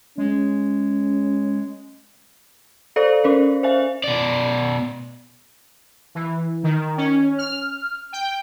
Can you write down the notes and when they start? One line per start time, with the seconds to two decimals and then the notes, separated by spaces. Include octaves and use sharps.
0.18 G#3 C#4
2.96 A4 C5 D5 F5
3.24 C#4 A#4 C5
3.63 C5 E5 F5 G#5
4.04 B2 D5
6.15 E3
6.63 D#3
6.97 C#4
7.38 F6
8.13 G5